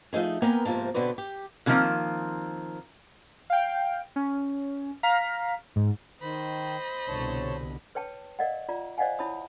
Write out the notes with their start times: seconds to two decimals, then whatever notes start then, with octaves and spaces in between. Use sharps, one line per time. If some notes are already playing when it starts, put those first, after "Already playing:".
0.13 F3 A3 D#4 G#4
0.42 A#3 B3 A#4 B4 G5 G#5
0.65 G#2 C3 F3 A#3 A5
0.94 B2 D3 C4 B4 D5
1.18 G4
1.66 B2 D3 D#3 F3 A#3 C4
3.50 F5 G5
4.16 C#4
5.03 F5 A#5 F6 B6
5.76 G#2
6.22 D#3 C5 D#5 B5
7.08 C2 B2 D3 C#5 A5
7.95 B4 C#5 G5 A5
8.39 A#4 D5 D#5 F5 F#5
8.69 F4 D5 A#5
8.98 C5 D5 D#5 F5 F#5 G#5
9.19 E4 C#5 A5 B5 D#6